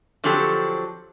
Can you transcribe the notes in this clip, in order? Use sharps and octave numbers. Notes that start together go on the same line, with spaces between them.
D3 F3 F#3 C4 G4 A4